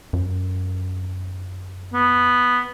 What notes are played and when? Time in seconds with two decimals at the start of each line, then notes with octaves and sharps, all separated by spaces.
0.13 F#2
1.93 B3